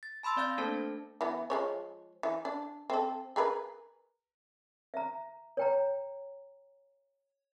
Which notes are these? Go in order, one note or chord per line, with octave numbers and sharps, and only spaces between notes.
A6
A5 B5 C6 E6 A6
C4 D5 F5 G6 A6
A3 A#3 D4 A4 C5 A5
E3 B3
F3 G#3 C#5
E3
D4
C4 A4
G#4 A#4 B4
E5 A#5
C#5 G5 A#5